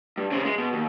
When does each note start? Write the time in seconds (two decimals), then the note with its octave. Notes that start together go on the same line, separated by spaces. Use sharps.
0.17 G2
0.31 C#3 C4
0.44 G#3
0.58 B2
0.73 D#2